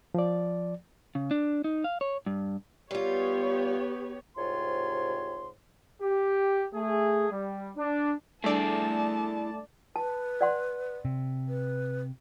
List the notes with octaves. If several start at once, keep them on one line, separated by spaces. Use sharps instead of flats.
F3 D5
C#3
D4
D#4
F5
C#5
G2
G3 B3 F4 G4 C#5
C2 G#2 C3 F4 C#5 C6
G4
A3 G#4
G3
D4
G3 A3 D4 E4 G#4 D5 A5
B4 A5
D5 F#5 C6
C3
B4